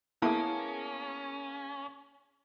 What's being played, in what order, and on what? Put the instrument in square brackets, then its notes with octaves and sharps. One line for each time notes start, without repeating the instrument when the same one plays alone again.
[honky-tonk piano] A#3 B3 G#4 [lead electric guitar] C#4 [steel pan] E4 [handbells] A5